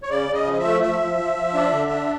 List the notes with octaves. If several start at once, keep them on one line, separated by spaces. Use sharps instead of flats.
C#5
C#3 D5
C#3
D#5
F3
D#5
E5
A3
F3 E5
F3
F3
F3
D4
D3
D4